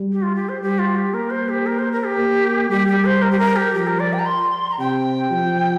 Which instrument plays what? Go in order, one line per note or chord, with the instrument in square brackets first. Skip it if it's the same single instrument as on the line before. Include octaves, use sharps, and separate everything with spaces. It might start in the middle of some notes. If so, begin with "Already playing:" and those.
Already playing: [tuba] G3
[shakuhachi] G4
F4
G4
C5
[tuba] G3 [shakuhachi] G4
[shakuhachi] F4
G4
[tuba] A#3 [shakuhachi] A#4
[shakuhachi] C5
G4
A#4
C5
A#4
G4
[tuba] A#3
[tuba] G3 [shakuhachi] G4
[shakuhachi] G4
C5
A#4
G4
A#4
G4
[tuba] F3 [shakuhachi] G4
[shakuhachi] A#4
D5
G5
A#5
C6
A#5
[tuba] C3 [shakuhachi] G5
[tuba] F3